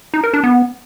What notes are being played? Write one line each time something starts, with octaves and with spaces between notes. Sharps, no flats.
D#4
A#4
D4
B3